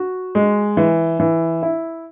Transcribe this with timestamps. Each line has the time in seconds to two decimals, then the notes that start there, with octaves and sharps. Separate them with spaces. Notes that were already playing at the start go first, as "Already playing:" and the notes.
Already playing: F#4
0.35 G#3
0.77 E3
1.20 E3
1.63 E4